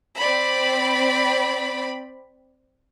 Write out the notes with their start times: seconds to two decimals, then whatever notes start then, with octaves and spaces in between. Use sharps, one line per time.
0.18 C4 D5 B5